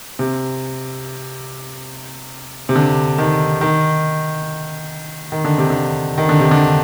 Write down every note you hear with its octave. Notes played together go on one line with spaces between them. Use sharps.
C3
C3
D3
D#3
D#3
D#3
D3
C3
D3
D#3
D3
C3
D3